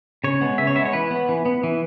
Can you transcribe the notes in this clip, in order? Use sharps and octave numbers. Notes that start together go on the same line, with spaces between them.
C#3 C#5
G#3 B3
C#3 E5
C#5
G#3 B3 E5
C#5
E3 B4
B3
E3
B3
E3